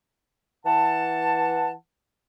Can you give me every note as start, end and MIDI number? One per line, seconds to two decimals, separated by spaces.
0.66 1.72 52
0.66 1.72 78
0.66 1.72 81